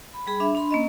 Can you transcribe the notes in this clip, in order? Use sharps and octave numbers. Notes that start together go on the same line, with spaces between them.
B5
G3 G#4 B5
D4 E5
D4 B5 C6
A#3 C#4 D#5